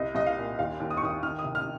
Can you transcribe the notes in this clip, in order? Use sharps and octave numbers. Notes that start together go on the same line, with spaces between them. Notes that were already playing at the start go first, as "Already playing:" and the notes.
Already playing: C2 D#5
C2 D#5
F5
A#2
D#2 F5
D#2
D#6
C#6
D#2 D#6
D#3 F6
D#6
C3
F6